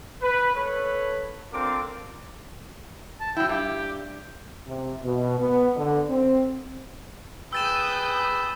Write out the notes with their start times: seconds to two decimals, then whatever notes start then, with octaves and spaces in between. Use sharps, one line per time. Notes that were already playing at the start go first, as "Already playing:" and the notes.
0.22 B4
0.55 A4 B4 C#5
1.52 C4 D4 F4 A4 A#4 D6
3.20 A5
3.37 F#3 E4 G5
3.49 G2 G4
4.67 C3
5.03 B2
5.39 B3
5.75 D3
6.09 C4
7.53 G#4 B4 G5 D#6 E6 G6 A6 E7